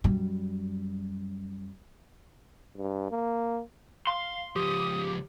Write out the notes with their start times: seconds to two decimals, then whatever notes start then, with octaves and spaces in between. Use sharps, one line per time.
0.04 F#2 G3
2.77 G2
3.11 A#3
4.07 F5 C6
4.56 C#2 F3 G4 D#6